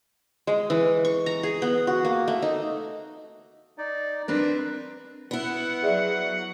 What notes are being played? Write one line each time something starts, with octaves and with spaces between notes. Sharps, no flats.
G#3
E3
C#6
A#5
G#4
B3
F#4
A#3
A3
D#4
D#4 D5
C4 D4 A#4 B4
B3 E4 F#5
F#3 G#4 D5 E5